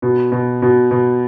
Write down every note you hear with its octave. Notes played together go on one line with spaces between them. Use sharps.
B2
B2
B2
B2